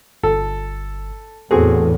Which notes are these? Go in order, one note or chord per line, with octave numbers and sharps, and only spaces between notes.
G1 A4
E2 A2 C4 F#4 G#4 A4